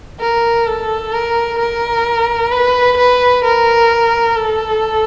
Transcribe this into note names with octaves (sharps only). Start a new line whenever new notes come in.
A#4
A4
A#4
A#4
B4
B4
A#4
A4